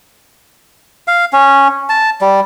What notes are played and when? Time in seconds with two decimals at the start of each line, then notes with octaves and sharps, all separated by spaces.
1.08 F5
1.33 C#4
1.89 A5
2.21 G3